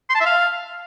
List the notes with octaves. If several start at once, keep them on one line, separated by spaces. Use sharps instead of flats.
C6
A5
E5
F5